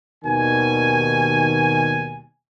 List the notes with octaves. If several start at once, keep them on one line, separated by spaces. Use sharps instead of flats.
D#2 B2 D#3 G3 G#5